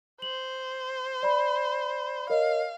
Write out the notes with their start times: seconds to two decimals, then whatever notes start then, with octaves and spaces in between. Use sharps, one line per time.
0.22 C5 F#7
1.23 D5 B5
2.30 A#4 C#5 D#5 F5